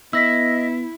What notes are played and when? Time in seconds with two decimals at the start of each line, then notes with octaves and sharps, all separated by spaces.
0.13 B3 E4 D#5 E6 A#6 B6